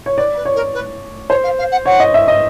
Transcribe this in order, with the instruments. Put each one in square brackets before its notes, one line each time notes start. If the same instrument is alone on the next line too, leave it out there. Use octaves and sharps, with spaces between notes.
[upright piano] C#5
[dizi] B4 [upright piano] D5
[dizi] B4
[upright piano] C#5
[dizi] A#4
B4
[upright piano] C5 [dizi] C#5
[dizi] F5
F5
F#5
[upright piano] C#5 [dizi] F#5
[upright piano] D#5
E5
D#5